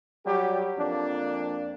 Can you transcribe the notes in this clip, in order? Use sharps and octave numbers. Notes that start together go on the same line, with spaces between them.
F#3 G3 G4
F2 A#3 D4